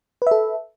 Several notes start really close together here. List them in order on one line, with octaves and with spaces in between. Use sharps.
B4 E5 A4